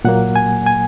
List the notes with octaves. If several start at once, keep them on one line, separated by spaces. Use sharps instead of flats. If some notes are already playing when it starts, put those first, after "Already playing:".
A#2 F#3 A#3 F#5
G#5
G#5